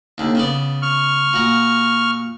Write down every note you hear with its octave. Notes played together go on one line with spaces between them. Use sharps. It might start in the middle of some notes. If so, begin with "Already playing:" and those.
D#2 D3
C#3 B3 D5
C#6 F6
A#2 F#4